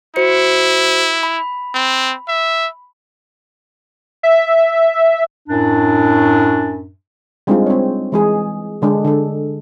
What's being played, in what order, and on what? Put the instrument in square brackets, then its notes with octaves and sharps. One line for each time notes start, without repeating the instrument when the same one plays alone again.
[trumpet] E4 [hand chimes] F#4 C5 C#7
[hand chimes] B5
[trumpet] C4
E5
[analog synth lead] E5
[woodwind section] F#2 A2 D4
[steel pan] G3 G#3 C4 D4 D#4 F4
C4 C#5
E3 G#3 G#4
D3 G#3 D4
D3 A4